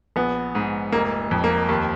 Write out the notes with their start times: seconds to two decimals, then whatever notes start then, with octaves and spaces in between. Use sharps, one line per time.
0.16 A#1 B3
0.55 G#2
0.92 F1 A#3
1.31 F2
1.44 A#3
1.69 D#2